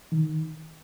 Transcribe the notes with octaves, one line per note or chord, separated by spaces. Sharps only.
D#3